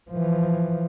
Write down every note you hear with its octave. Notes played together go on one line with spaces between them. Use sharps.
E3 F3